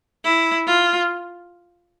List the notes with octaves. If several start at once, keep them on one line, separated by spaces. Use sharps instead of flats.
E4
F4